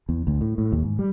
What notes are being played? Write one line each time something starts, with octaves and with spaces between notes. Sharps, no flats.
E2
D2
A2
A2
D#2
G#2
G3